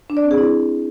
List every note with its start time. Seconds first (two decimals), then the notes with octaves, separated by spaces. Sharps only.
0.10 D4
0.17 D5
0.24 C4
0.31 G#4
0.38 E4